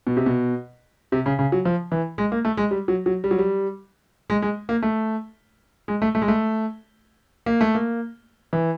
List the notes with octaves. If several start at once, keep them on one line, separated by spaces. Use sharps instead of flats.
B2
C3
B2
C3
C#3
C#3
F#3
F3
E3
G#3
A#3
A3
G#3
G3
F#3
F#3
G3
F#3
G3
G#3
G#3
A#3
A3
G#3
A3
A3
G#3
A3
A#3
A3
A#3
E3